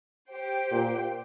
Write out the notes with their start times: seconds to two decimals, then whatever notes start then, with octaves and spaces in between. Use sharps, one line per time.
0.32 G4 C5 G5
0.72 A#2